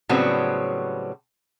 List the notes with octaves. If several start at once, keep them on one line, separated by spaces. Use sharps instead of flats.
A2 C#3 F#3 G3 B3 C4